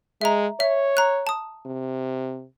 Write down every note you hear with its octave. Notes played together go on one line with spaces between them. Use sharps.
G#3 E5 A#5
C#5 E5
A#5 F#6
A5 D#6
C3